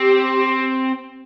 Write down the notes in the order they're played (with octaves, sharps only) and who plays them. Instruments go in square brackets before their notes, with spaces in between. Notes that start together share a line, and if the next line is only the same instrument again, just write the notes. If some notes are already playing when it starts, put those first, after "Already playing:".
Already playing: [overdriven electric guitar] C4 [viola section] G4